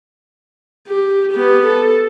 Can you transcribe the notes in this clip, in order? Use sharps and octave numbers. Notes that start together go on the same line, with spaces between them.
G4
B3 G4
A4